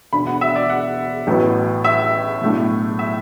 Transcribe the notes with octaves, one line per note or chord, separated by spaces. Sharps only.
E1 D2 D3 B5
F#5
E5
D5
F#5
A1 A2 F#3 B3
E5
B1 A2 A3 D4
E5